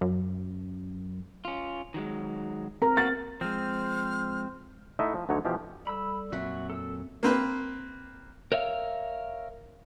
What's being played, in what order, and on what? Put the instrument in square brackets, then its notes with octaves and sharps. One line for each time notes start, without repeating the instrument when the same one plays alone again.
[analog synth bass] F#2
[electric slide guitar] C#4 F4
D#3 F#3 G#3
[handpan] C4 A#4 [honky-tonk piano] A#5
[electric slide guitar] A#3 B3 F#4 [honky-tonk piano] A6
[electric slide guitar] F3 G#3 [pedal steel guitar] C4 [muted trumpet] C5 [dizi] F6
[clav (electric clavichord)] A3 D#4 E4 D#5 E5 F#5
F3
D2 D3 F#3 D#4 C#5
B2 E3 F3 F4 G4
[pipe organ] G3 A4 [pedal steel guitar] B5 E6
[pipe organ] F2 [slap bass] A#2 F#3 [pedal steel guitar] F#4 E5
[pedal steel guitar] A4 E6
[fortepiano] A#3 C4 B4
[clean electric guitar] A#4 C#5 E5 F5